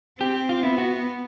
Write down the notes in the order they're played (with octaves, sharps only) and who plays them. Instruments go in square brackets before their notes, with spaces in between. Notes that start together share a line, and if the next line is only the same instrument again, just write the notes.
[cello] C4 [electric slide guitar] G4
[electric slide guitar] F4
[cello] B3 [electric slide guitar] E4
[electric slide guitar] F#4